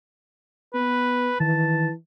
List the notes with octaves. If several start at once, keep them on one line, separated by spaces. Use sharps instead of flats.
B3 B4
D#3 E3 A5